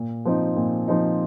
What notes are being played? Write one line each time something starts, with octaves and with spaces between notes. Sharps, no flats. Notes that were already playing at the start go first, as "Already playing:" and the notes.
Already playing: A#2
F3 C4 D#4
A#2
F3 C4 D#4